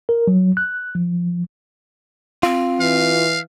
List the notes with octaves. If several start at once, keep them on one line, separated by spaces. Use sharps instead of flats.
A#4
F#3
F#6
F3
C4 F4
E3 F5